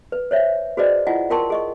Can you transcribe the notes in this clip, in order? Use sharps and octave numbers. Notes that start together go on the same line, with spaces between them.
B4
C5 C#5 E5
F#4 G#4 B4 C5 D5 D#5
E4 F4 D#5 F#5 G#5
F4 A#4 G5 A5 C6 C#6
G#4 D#5 C#6